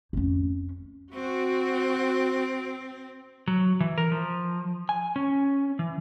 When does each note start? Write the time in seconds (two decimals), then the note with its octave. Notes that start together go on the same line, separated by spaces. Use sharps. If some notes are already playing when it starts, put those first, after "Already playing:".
0.13 F2 C#4
1.14 C4 F#4
3.48 F#3
3.80 E3
3.98 A#4
4.12 F3
4.89 G#5
5.16 C#4
5.79 E3